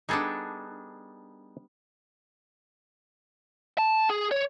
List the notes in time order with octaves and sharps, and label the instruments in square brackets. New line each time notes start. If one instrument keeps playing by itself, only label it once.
[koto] G3 B3 D4 [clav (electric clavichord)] D#4 G#4 A4
[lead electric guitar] A5
G#4
C#5